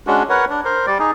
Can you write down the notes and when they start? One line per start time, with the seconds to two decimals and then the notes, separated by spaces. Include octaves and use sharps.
0.07 G#3 C#4 D4 F#4
0.30 A#4 B4 C#5 F#5
0.50 D4
0.65 A#4 C5
0.87 G3 D5
0.99 D#4 G#4